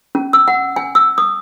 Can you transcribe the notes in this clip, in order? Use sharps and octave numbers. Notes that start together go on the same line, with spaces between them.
C#4
E6
F#5
G#5
E6
D#6